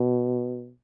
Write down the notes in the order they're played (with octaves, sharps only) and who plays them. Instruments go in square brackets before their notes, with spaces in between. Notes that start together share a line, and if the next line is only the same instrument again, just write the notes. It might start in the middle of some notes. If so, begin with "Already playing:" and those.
Already playing: [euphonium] B2